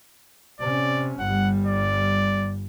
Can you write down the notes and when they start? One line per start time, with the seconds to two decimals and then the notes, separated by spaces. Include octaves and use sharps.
0.60 C3 C#4 D5
1.19 G1 G3 F#5
1.67 D5